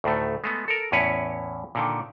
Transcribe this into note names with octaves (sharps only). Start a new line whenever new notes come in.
D2 A2 D#3 A3
G#3 A3 B3
A4 A#4
E2 A2 C#4 E4 B4 C#5
A#2 D3 D#3